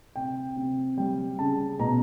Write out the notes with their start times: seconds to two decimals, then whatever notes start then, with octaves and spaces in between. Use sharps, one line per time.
0.16 C3 G5
0.56 C3
0.97 G3 G5
1.39 C#3 A5
1.79 B2 A#5